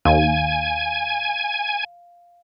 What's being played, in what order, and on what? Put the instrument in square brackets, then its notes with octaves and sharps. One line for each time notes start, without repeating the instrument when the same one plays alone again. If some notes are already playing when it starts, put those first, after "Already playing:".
[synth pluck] D#2 [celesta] F5 [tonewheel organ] G#5